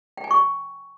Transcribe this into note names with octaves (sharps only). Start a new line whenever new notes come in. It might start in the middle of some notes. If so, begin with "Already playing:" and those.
G5
G#5
C#6